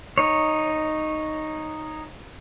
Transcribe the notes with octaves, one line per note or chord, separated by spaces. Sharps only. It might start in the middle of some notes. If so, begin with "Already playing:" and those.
D#4 C#5